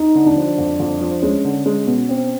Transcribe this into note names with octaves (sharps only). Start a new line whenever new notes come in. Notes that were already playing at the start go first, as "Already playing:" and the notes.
Already playing: D#4
D3
D4
F3
F2
F2
F3
G#3 C#4
D3
G#3
B2
C4